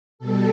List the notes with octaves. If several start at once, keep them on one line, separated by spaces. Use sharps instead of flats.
B2 G3 A4